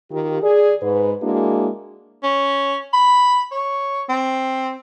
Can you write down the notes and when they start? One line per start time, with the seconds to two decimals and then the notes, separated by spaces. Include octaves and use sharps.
0.12 D#3 F4 G4
0.43 G#4 D5
0.82 G#2 B4
1.22 G#3 A#3 D4 E4 F#4 G#4
2.23 C#4
2.93 B5
3.51 C#5
4.09 C4